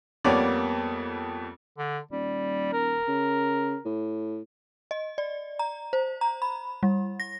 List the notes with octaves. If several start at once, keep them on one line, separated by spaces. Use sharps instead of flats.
F2 G3 A#3 B3 C#5 D5
D3
D#1 G3
A#4
C#3
A2
D#5
D5
A#5
C5
A#5
B5
G3
A#6